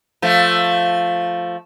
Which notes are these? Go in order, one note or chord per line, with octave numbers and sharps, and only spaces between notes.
F3 A3